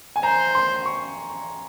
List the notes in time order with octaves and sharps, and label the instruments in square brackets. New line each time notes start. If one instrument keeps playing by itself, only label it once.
[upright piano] G#5
[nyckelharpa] C5 [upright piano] A#5
[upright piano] C6
C#6